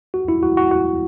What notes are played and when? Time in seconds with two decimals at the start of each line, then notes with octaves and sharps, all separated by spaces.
0.14 F#4
0.28 E4
0.43 F#4
0.57 F#4
0.71 F#4